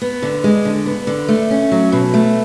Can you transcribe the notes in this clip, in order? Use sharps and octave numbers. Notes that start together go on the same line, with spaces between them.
B3
D3
G#3
D3
B3
D3
A3
C#4
F#3
B2
A3